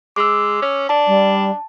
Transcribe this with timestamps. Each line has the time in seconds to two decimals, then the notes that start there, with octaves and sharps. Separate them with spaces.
0.16 G#3 D6 E6
0.62 C#4
0.89 D4 A5
1.07 G3